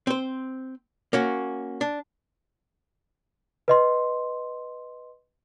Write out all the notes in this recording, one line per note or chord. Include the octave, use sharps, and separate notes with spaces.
C4 C5
A#3 C#4 F#4
D4
B4 D#5 C6